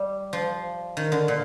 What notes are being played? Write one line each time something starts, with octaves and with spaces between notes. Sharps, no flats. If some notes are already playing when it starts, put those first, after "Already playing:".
Already playing: G3
F3
D#3
D3
A#2